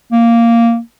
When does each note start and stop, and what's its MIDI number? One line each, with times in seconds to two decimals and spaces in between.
0.12 0.78 58